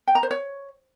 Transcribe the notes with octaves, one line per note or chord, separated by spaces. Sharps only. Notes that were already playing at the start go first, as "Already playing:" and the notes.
G5
A#5
C5
C#5